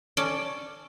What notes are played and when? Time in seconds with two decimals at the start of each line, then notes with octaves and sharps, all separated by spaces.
0.17 C#4 A4 D5